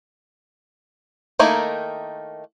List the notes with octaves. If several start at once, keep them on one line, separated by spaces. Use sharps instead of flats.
D#3 A3 A#3 D#4 E4